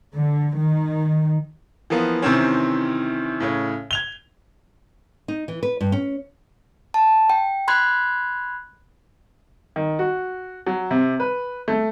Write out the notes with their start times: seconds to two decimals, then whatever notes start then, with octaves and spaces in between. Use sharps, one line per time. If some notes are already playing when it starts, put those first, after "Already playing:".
0.15 D3
0.57 D#3
1.90 E3 F3 A#3 B3
2.22 C3 D#3 E3 C4 C#4
3.40 A2 C#3 C#5
3.91 G#6 F7 G7
5.28 D#4
5.48 E3
5.63 B4
5.81 G2
5.92 C#4
6.94 A5
7.30 G5
7.68 B5 C6 F#6 G#6
9.76 D#3
9.99 F#4
10.67 F#3
10.91 C3
11.20 B4
11.68 A3